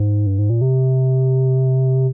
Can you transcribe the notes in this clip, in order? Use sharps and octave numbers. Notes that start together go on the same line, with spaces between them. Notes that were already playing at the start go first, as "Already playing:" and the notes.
Already playing: G#2
G2
G#2
A#2
C3